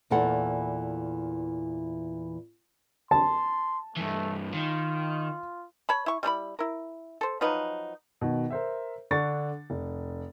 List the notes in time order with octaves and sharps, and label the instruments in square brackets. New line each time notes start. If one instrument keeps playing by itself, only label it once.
[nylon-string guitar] E2 A#2 E3 A4 F#5
[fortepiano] A5 [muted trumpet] C6
[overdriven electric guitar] G2 E3 [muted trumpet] A3
[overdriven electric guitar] D#3 [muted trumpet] F4
[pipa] C#5 A5 B5
E4 C#6
G3 A3 E4 B5
E4 A#4
A4 C5
F3 F#3 D#4 B4
[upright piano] B2 D#3
A#4 C5 E5
D3 D4 D5 C#6 A6
F1